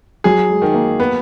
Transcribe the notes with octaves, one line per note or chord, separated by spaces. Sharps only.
F#3 G#4
G#3
D#3
A#3
B3